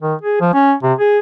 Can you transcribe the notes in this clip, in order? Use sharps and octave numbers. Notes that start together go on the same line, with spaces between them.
D#3
G#4
F3
C#4
C3
G#4